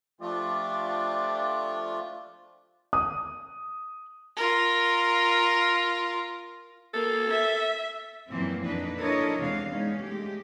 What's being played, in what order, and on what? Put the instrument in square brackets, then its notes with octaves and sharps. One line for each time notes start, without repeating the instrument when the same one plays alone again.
[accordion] F3 A3 F4 [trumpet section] D4 G4 D5
[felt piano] D#6
[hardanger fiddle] F4 A#4
[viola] A#3 [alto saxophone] A4
[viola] E5
[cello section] F#2 A#2 E3 F3 A#3 C4
F2 A#3 D4 D#4 B4
D4 E4 A4 A#4 C#5 D#5
E2 C3 G#3 D4 F5
G#3 B3 C#4 D#4
G#3 A3 G4